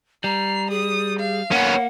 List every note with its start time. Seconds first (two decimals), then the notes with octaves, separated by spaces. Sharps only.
0.24 G3 A#5 C7
0.70 G#4 D#6
1.19 F5
1.52 A#3 B3 C#4 F#5